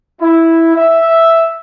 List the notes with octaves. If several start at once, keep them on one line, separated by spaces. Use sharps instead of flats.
E4
E5